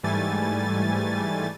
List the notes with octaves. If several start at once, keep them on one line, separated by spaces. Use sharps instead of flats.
G#2 E3 G3 A3 G#5 A6